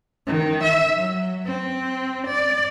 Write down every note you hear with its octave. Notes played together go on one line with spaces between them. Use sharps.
D#3
E5
F#3
C4
D5